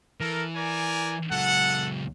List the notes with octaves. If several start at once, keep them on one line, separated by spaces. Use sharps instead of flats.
E3 A4 A#4
A#4 D5 G#5
C#2 F#3 A4 F#5